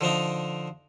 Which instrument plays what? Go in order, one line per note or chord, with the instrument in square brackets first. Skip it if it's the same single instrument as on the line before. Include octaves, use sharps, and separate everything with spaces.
[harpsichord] D3 F3 D4 D#4